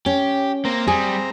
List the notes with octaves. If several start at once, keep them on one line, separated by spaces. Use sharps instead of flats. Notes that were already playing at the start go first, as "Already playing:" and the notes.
C#4 G4
A#3 C4 A#5
G3 G#4